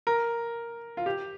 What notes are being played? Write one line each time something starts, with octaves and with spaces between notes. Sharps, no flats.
A#4
F4
G4